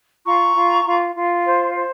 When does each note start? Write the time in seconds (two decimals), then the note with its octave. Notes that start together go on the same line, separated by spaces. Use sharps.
0.25 F4 A#5 C#6
0.55 F4
0.85 F4
1.14 F4
1.44 C5
1.74 C5